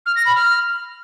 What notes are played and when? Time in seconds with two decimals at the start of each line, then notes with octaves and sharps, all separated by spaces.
0.06 F6
0.16 A#6
0.26 B5
0.35 F6